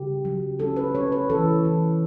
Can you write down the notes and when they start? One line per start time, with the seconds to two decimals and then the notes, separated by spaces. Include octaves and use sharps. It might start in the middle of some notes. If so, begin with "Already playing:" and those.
Already playing: C#3 G4
0.25 F#3
0.60 C#4 A4
0.76 B4
0.95 C#4 C#5
1.12 B4
1.30 E3 A4
1.65 E3